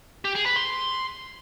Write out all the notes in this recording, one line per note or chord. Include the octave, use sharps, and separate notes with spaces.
G4
G#4
B4
C6